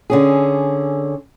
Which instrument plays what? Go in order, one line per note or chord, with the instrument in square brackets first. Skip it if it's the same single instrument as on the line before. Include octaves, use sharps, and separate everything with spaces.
[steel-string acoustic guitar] D3 C#4 G#4